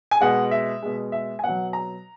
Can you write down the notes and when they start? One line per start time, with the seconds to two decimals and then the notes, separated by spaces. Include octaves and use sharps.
0.11 G#5
0.21 B2 G#3 F#5
0.51 E5
0.82 B2 G#3
1.12 E5
1.39 G#5
1.44 B2 F#3 F#5
1.73 A#5